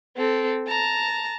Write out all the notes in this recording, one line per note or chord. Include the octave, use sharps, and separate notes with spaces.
C4 A4
A5 A#5